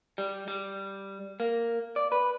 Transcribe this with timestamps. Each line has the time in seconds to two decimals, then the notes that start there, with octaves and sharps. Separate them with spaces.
0.18 G3
0.48 G3
1.40 A#3
1.96 D5
2.12 B4